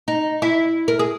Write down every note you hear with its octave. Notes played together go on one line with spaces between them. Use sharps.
D#4
E4
A#4
G#4